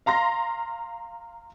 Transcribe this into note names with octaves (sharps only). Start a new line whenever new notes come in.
F5 A#5 C6 A#6